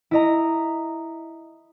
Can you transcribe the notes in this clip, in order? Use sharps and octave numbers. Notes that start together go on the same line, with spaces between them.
E4 D#5 A#5